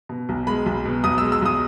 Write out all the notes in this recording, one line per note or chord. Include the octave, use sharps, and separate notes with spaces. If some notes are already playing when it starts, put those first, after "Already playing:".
B2
B1
G#3 B5
B1
B2
B1 D#6
G#3 E6
E6
B1 D#6